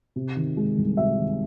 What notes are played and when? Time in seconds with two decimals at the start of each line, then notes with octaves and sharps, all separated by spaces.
0.16 C3
0.36 D#3
0.57 G#3
0.78 C2
0.97 C3 E5
1.19 D#3